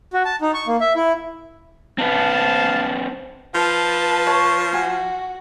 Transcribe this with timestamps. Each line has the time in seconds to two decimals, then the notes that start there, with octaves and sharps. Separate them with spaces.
0.13 F#4
0.25 A5
0.41 D#4
0.54 C#6
0.67 A#3
0.81 E5
0.96 E4
1.98 C4 D#4 B4 F5 A5
3.55 F3 B4 A5
4.27 C#5 C#6
4.73 F#4 G#5